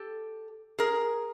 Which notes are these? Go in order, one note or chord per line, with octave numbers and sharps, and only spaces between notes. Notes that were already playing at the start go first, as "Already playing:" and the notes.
Already playing: G4 A4
G#4 A#4